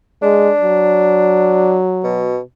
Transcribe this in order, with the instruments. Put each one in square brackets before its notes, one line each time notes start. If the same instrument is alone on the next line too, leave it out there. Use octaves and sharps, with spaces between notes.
[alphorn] G#3 [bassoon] D4
[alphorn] F#3
[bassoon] B2